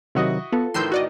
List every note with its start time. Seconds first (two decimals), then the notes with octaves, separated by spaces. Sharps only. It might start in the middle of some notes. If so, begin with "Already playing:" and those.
0.15 C3 D#3 F#3 E4 F#4 D#5
0.52 B3 F4 A4
0.74 A2 D#3 E3 C6 E6 G6
0.92 F#4 D5 D#5